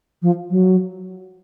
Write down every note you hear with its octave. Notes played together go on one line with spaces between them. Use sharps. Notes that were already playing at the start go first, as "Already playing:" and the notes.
F3
F#3